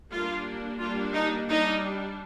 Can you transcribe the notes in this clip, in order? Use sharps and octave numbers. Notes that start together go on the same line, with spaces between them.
G3 A#3 D4 F4
G3 A#3 D4 F4
D#4
G3 D4 D#4